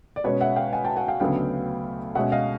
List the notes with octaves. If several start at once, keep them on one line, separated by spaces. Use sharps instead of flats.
D5
B2 G#3 C#4 B4 C#5
E5 F#5
F5 G5
F#5 G#5
G5 A5
F#5 G#5
F5 G5
D2 C#3 F#3 B3 D4 F5 G5
B2 G#3 C#4 E5 F#5
D#5 F5